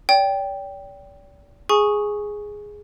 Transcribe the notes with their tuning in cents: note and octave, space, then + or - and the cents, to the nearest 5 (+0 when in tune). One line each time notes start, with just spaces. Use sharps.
D5 -45 G5 +0
G#4 +0 G#5 +0 C#6 -5